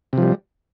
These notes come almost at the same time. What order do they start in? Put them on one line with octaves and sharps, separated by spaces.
C3 F3 G3